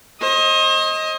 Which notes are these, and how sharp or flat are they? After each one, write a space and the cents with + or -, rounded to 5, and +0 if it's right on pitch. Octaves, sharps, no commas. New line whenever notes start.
C5 +45 D#5 +15